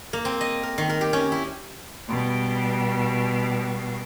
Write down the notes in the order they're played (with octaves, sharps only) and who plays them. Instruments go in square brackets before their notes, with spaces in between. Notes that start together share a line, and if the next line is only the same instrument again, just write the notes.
[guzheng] A#3
C4
D#5
A#4
D#3
A#4
G4
C#4
E4
[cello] B2 G3